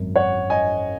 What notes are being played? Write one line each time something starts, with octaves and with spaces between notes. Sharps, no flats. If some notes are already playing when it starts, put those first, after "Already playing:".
Already playing: G#1 F#2 F#3
C#5 F#5
D#5 G#5